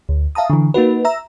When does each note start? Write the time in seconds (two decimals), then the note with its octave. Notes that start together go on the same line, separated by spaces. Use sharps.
0.09 D2
0.35 E5 F5 A5 A#5 D#6
0.50 D3 E3
0.74 A#3 D#4 F#4 B4
1.05 E5 A#5 E6